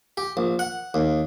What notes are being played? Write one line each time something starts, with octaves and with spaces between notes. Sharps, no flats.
G4
A#1
F#5
D#2